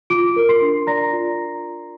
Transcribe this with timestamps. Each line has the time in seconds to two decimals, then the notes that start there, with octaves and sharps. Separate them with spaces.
0.10 F4 D6 D7
0.36 A#4
0.49 C6 C7
0.62 D4
0.87 D5 A#5 A#6
1.13 F4